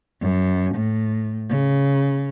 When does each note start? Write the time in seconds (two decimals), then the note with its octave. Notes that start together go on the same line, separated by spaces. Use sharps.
0.21 F#2
0.74 A2
1.50 C#3